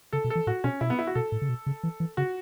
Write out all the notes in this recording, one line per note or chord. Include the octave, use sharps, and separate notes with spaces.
C#3 A4
B2
A4
E3
A2 F#4
B2 C#4
B2 E4
B3
E4
F#4
B2 A4
A2
C#3
B2
C#3
E3
E3
C#3 F#4